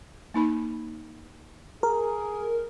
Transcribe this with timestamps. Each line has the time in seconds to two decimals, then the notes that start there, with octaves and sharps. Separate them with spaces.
0.34 A#3 D#4 B5
1.83 G#4 A#4